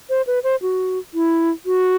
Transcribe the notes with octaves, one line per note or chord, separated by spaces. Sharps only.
C5
B4
C5
F#4
E4
F#4